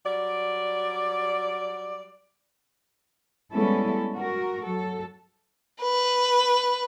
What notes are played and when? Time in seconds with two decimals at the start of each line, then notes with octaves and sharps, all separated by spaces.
0.06 F#3 G3 D5
3.53 G3 G#3 B3 C#4 E4 A4
4.16 F#4 A#4
4.63 F#3 A4
5.81 B4